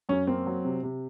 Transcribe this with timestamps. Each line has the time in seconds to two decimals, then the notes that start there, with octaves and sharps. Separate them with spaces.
0.09 F#2 C#4
0.27 A#3 C4
0.46 F#3
0.65 C3
0.83 C3